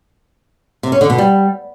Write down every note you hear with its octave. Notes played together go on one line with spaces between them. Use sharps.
C3
C#4
D3
B2
G3